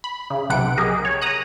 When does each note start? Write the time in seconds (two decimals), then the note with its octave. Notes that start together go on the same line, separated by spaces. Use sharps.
0.04 B5
0.30 C#3
0.50 B1 C3 B4 F#5 D7
0.78 G4 G#4 A#4 D#5
1.05 C#5
1.21 A#5 D#6 F#6